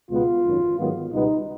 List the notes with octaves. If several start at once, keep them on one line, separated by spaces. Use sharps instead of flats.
C#2 B2 G#3 B3 F4
G#1 F#2 D#3 F#3
G#2 D#3 F#3 B3
C#2 B2 G3 B3 D#4